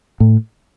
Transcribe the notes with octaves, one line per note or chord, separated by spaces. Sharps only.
A2